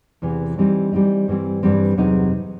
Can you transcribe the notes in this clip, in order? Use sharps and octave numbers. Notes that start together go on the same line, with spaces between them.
E2 C3 E3
E3 G3 C4 D#4
E3 G3 C4 D#4
G2 E3 G3 C4
G2 E3 G3 C4
E2 C3 F#3 C4 D#4